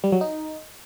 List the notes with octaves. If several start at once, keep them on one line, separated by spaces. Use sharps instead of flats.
G3
F#3
D#4